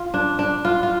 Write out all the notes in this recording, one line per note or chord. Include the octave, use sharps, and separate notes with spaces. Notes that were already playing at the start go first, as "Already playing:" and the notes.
Already playing: F4
D4
D4
F4
F4